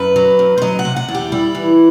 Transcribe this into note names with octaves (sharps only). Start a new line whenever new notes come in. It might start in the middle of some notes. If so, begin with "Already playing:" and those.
Already playing: F#2 B4
F#3
F#2
C5
F#3 D#5
F#5
C3
F#5
E2
G4
G3 E4
E3